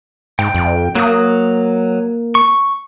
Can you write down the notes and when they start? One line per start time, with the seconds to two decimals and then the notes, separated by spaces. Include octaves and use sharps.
0.39 G#2 G5
0.54 F2
0.95 F#3 A#3 D#6
2.35 C#6